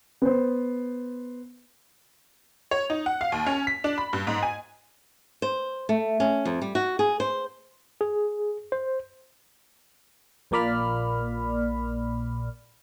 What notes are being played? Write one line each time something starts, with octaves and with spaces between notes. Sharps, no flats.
B3 C5
C#5
D#4
F#5
F5
D#2
C#4
B6
D4
B5
G2
G#2
G#5
C5
A3
C#4
F2
G3
F#4
G#4
C5
G#4
C5
A#1 A#2 A#3 D5 B5 F6